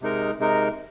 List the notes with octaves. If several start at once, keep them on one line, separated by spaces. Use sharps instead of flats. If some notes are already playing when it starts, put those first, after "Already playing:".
C3 G#3 D#4 A#4
C3 G#3 D#4 A#4